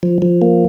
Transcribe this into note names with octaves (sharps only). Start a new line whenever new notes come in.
F3
F3
A#3